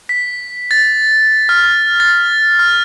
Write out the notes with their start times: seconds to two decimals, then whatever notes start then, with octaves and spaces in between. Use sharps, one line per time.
0.09 B6
0.71 A6
1.49 F6
2.00 A6
2.59 F6